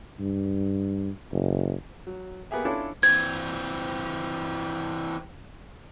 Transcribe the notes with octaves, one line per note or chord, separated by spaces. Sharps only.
G2
F#1
F#3
A#3 B3 G4 G#4 E5
C#4 D4 E4 F4 A4 C#5
E3 C4 G#6